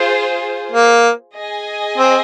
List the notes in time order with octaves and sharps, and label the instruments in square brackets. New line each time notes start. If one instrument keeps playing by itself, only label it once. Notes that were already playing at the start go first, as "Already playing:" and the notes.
Already playing: [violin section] F4 G#4 C5
[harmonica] A#3
[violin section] G#4 D#5 G#5
[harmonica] C4